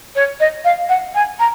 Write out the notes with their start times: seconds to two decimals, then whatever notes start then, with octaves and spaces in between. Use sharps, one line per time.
0.15 C#5
0.40 D#5
0.65 F5
0.89 F#5
1.15 G#5
1.39 A#5